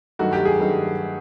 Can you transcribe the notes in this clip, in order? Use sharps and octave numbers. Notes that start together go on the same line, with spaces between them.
G2 D#3 F#3 A3 F#4
G4
G#4
G2 D#3 F#3 A3